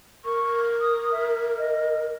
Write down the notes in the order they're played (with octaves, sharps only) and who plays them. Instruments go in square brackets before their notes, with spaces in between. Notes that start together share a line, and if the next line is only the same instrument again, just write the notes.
[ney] A#4 [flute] C#6
[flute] D#6
E5
D#5